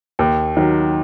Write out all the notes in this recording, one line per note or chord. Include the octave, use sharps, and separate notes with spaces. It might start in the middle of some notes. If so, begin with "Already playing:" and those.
D#2
D#3 F#3